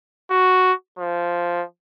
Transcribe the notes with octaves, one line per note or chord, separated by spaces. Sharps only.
F#4
F3